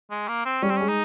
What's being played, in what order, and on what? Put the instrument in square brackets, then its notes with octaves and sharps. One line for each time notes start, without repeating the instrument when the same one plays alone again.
[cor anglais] G#3
A#3
C4
[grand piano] G3 [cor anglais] C#4
[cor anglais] C4
[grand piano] G#3 [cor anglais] C#4
[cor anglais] D#4